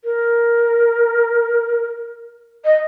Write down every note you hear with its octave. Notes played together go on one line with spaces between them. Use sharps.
A#4
D#5